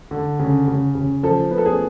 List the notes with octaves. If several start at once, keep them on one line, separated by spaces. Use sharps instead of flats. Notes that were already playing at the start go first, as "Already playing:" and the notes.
D3
C#3
C#3
C#3
F3 A4
B3
A4
G#4